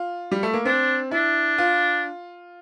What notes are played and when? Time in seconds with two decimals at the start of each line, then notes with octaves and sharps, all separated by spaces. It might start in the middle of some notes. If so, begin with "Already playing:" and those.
Already playing: F4
0.31 G3
0.43 A3
0.53 A#3
0.65 C4 D4
1.11 D4 E4
1.58 F4